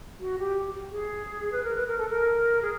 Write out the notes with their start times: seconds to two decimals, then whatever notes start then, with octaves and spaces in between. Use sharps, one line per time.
0.20 F#4
0.39 G4
0.92 G#4
1.52 B4
1.63 A#4
1.76 B4
1.87 A#4
1.98 A4
2.10 A#4
2.62 G#4